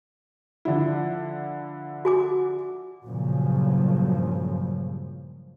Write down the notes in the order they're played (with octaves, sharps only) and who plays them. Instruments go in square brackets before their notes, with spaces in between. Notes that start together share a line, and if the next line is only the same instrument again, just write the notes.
[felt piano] D3 F3 E4
[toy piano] F#4 G#5 D6
[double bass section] G2 A#2 C#3 F3 F#3